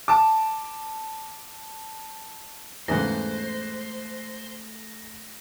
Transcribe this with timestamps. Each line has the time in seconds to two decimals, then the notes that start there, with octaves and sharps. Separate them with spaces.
0.08 A5 D6
2.88 E2 G#2 C#3 A3 C5 F#6 A#6